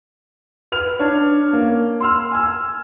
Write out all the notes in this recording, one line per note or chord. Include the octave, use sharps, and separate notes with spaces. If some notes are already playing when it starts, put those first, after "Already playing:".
B4 F6 F7
D4 C#5
A#3
C6 E6 F6
G#5 E6